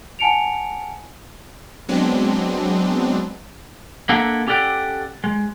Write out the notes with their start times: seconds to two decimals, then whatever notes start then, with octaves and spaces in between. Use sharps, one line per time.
0.19 F#5 G#5 A5 C#7 D7 F7
1.89 F#3 G#3 B3 C4 D4
4.09 A#3 D4 E4 A4 A#4 F#5
4.47 C#4 G4 A4 D5 F#5 G5
5.24 G#3